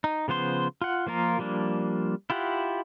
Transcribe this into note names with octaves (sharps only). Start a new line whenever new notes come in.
D#4
C#3 F3 B3 C5 C6
F4 F#5
F3 A#3 F4 A#4
F3 G3 A#3 D4
E4 F4 G4 F#5